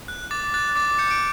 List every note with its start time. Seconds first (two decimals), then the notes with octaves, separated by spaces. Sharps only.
0.08 F#6
0.31 D6 A6
0.54 F#6 A6
0.76 D6 A6
0.99 G6 C#7
1.11 D7